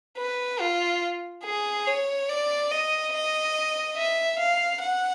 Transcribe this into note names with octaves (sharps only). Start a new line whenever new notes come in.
B4
F4
G#4
C#5
D5
D#5
D#5
E5
F5
F#5